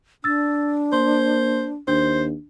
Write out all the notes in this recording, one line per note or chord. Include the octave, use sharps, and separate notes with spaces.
D4 E6 A6
A#3 C5 C6
D#2 D4 C5